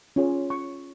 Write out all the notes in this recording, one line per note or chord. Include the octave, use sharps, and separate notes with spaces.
C#4 F4 G#4 C#5
C#6